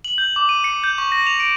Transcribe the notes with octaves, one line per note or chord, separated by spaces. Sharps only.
F#7
G6
D6
D#7
C#7
G6
C#6
A#6
F7
D7